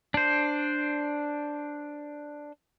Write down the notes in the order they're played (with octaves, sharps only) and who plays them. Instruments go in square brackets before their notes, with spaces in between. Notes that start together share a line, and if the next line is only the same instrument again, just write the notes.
[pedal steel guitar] D4 C5